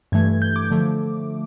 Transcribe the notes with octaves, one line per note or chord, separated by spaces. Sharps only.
G2 E3 A3 G#6
G6
D6
D3 F3 A3